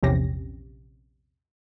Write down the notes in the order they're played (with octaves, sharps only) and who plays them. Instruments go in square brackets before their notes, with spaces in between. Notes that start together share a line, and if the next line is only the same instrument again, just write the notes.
[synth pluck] A#1 E2 C3 C#4 G4 A#6